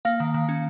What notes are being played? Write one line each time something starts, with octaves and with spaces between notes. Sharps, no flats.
A#3 F5
D#3
D#3
C#4